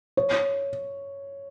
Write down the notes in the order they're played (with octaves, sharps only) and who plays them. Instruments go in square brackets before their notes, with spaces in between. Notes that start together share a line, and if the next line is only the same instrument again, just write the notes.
[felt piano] C#5